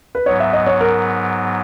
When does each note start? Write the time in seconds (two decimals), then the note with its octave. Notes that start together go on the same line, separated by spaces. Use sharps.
0.15 B4
0.26 G#2 F#3 B3 C#5
0.40 E5
0.53 D#5
0.67 C#5
0.81 A#4